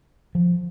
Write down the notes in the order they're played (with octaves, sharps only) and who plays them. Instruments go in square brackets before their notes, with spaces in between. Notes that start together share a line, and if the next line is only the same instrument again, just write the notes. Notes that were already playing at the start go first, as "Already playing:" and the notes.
[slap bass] F3